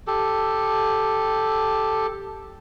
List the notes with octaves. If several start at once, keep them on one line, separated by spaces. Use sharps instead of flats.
G4 A4